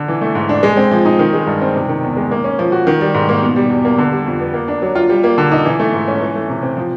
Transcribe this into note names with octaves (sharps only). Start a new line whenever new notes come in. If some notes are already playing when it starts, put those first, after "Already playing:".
Already playing: D3
E3
A3
G#2
D4
G#3
C4
F3
D#4
D#3
G#3
G2
C4
C3
D#3
E2
G#3
A#3
C#4
F3
F#4
D#3
G3
G#2
A#3
B2
G3
E2
A#3
D3
G3
F2
B3
A#3
D4
F#3
F4
G3
A#3
D3
D#4
E3
A3
G#2
C#4
E3
A3
C3
C4
F3